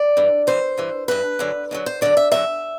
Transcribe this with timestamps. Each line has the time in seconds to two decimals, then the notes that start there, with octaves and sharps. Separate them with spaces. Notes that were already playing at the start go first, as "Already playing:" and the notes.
Already playing: D5
0.17 G2 E3
0.47 G2 E3 C5
0.78 G2 E3
1.08 G2 E3 B4
1.39 F#2 D3 F#3
1.71 F#2 D3 F#3
1.86 C5
2.01 F#2 D3 F#3 D5
2.17 E5
2.32 F#2 D3 F#3 E5